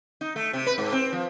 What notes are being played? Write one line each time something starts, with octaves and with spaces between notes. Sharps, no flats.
D#4
A3
C3
B4
G#2
C4
F3